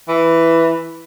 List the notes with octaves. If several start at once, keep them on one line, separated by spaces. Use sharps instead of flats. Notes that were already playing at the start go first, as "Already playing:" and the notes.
E3